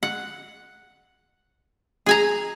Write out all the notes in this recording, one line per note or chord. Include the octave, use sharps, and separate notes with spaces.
F#5
G#4 G#5 A#5